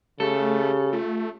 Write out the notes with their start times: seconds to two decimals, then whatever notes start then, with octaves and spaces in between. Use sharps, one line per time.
0.20 C#3 A3 G4 A4
0.93 A3 F4